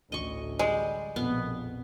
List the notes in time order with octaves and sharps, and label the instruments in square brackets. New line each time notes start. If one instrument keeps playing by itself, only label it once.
[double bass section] A1 D2 [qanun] D#5 C#6
[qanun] G3 [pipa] G#3
[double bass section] A#1 F2 B2 [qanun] B3